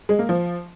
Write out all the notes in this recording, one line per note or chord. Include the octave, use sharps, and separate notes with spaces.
G#3
A#3
F3